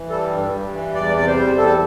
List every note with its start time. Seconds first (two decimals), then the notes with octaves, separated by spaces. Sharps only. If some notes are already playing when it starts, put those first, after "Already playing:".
Already playing: E3
0.09 G3 A4
0.30 G2
0.52 G2
0.73 E3
0.94 E2 D5
1.16 C3 D5
1.27 C5
1.37 G3
1.57 E2 A4